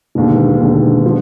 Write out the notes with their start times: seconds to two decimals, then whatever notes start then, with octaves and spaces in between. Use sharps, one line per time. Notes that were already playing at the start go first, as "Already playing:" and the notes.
0.15 E1 D#2 D3
0.60 E1 D#2 D3
1.06 F3